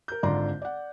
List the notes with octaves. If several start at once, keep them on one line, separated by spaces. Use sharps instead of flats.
A#4 G6
G#1 D3 F4 D5 A#5 C6
D5 F#5